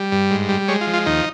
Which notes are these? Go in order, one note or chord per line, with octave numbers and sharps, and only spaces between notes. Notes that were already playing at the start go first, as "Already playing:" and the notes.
Already playing: G3
G2
G#2
G3
G#3 C#5
F4
F3
F4
D#2 D#4